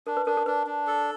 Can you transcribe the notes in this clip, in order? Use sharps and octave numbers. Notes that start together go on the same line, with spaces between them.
D4 A#4
B4
D4 A#4
A#4
D4 B4
D4
A4